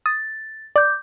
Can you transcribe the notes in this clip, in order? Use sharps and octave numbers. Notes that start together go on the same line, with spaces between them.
D#6 A6
D5 D6 G6